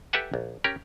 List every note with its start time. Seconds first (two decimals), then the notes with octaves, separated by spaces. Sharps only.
0.13 G4 A4 B4 E5 F#5 G#5
0.34 A#1
0.64 C#4 G4 A#4